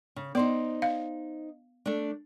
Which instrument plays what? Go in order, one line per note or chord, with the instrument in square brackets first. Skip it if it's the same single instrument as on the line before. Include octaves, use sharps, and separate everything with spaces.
[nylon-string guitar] C#3
[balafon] B3 [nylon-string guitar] D#4 C5 D5
[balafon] F5
[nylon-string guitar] A3 D4